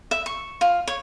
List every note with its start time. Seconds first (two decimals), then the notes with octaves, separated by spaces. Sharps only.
0.11 E5
0.26 C#6
0.61 F4
0.87 C#5